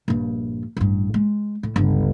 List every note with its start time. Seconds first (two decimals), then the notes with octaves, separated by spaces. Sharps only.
0.08 A#1 G2
0.77 A1 G2
1.14 G#3
1.63 A2
1.76 G1 C#2